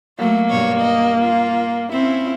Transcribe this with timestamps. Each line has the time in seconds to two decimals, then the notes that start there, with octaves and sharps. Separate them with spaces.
0.19 F#3 A3 A#3
0.50 G2 B2 C#5
0.81 D#5
1.21 F4
1.92 C4 C#4 E4